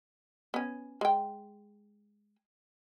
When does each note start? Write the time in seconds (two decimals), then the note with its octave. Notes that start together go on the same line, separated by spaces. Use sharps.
0.54 B3 C#4
1.01 G#3 G5